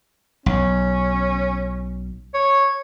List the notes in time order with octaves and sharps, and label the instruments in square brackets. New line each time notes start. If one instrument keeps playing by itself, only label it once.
[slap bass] B1 [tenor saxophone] C#4
[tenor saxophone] C#5